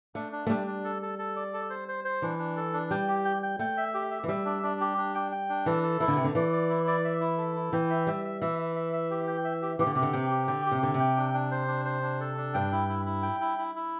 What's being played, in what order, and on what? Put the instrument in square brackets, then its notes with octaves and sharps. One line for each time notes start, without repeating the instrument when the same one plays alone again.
[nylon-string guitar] A3 [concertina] D4
[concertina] D4
[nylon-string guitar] A3
[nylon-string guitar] G3 [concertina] D4
[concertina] D4
A4
A4
A4
D5
A4
C5
C5
C5
[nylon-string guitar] E3 [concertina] D4
[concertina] D4
A4
D4
[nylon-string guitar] G3 [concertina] G5
[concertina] G4
G5
G5
[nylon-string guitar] A3 [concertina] G5
[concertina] E5
G4
E5
[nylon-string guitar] E3
[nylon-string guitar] G3 [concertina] E5
[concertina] D4
D4
G4
D4
G5
G5
D4
[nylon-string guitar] E3 [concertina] A4
[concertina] A4
[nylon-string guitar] E3 [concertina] E4
[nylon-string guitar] D3
[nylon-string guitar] C3 [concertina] A3
[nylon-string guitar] D3
[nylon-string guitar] E3 [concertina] D5
[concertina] D5
E4
D5
E5
E4
A4
E4
[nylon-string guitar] E3 [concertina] G5
[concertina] E5
[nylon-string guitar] G3 [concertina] E5
[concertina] E5
[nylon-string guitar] E3 [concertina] E5
[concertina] E5
E5
E5
G4
G5
E5
G4
[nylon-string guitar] E3 [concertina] G4
[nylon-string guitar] D3
[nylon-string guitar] C3 [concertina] G4
[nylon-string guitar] D3
[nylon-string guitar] C3 [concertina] G5
[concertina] G4
[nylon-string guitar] D3 [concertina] G5
[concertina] G4
[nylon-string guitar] C3
[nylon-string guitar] D3 [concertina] G4
[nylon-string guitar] C3
[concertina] G5
D4
D4
C5
D4
C5
D4
A4
D4
[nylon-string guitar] G2 [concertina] G5
[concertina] E4
E4
E4
G5
E4
E4
E4